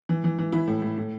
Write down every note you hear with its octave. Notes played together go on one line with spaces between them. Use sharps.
E3
E3
E3
E3 E4
A2
A2
A2